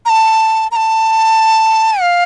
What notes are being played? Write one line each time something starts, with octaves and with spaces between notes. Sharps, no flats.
A#5
A5
A#5
A5
F5